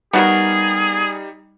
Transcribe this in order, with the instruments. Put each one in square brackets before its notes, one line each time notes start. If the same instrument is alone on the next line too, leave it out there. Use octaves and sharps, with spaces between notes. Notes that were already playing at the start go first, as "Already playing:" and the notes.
[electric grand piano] G3 D#4 [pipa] B3 F#4 A#4 [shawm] G#4